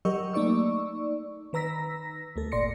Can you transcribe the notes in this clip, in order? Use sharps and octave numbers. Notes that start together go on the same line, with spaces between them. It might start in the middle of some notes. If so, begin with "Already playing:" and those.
F#3 G4 A#4 D#5 C#6 E6
A3 A#3 D#4 D5 C#6 E6
D#3 B4 A#5 E6 A#6 B6
D2 A3 A4
G1 A#2 D5 C6 A#6 C#7